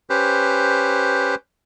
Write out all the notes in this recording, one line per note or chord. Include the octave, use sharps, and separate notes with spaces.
C#4 G4 B4 C5